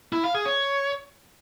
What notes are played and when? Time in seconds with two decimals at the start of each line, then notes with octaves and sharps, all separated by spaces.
0.13 E4
0.24 F5
0.35 G#4
0.45 C#5